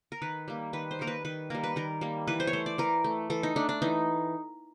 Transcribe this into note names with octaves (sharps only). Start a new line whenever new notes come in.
A#4
D#3 B4
G3 A#3
D#3 B4
C5
G3 A#3 A#4
B4
D#3 B4
G3 A#3 A#4
B4
D#3 A#4
G3 A#3
E3 B4
C5
C#5
A3 C5
D5
E3 A#4
A3
E3 A4
D#4
A3 D4
D4
E3 D#4